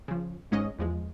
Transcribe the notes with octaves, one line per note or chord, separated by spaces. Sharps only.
C#3 F3
G#1 G#2 G#3 C#4 D#5
E2 F3 G#3